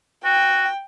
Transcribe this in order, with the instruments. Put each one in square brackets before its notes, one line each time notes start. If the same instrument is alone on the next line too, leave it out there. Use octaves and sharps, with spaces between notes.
[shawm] F#4 [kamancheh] G5